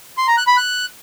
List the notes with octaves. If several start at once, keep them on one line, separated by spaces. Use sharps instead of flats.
C6
A#5
F#6
B5
F#6